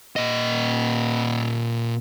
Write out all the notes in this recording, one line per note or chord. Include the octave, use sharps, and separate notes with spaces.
A#2 D#5